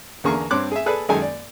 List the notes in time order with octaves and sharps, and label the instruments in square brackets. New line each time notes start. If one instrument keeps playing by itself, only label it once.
[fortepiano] E2 D3 A#3 G#4 A#5 C#6
G2 C4 C#5 C6 D6 F#6
G#4 E5
G#4 A4 B4 D5 F#6
F#2 D#3 G#3 A4 G#5
D5